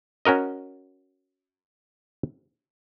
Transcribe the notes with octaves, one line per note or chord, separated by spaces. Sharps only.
C#4 F#4 A#4 D#5